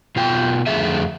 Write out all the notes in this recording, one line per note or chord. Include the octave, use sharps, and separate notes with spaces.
B2 F4 G5
F2 D3 A3 G#4 E5